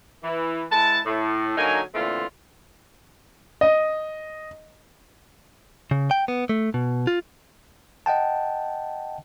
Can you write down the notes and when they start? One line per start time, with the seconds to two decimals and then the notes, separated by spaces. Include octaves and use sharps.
0.24 E3
0.70 G#3 E4 B4 A5
1.06 A2
1.58 D3 F#3 A#3 D#4 G#5
1.94 A#2 D3 E3 A3 C4 F4
3.61 D#5
5.91 C#3
6.11 G5
6.28 B3
6.49 A3
6.74 B2
7.07 F4
8.06 D#5 F#5 G5 A5